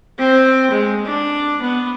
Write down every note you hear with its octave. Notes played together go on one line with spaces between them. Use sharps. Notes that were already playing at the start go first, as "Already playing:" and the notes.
C4
G#3
D4
B3